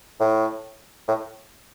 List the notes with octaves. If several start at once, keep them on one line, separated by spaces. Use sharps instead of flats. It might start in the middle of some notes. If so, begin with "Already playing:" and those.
A2
A2